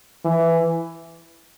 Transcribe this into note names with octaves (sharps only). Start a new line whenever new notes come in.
E3